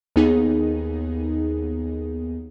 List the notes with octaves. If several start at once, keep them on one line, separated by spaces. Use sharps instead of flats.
D#2 B3 D#4 G#4